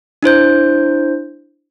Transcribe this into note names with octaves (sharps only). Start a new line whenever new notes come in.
D4 E4 C5 G6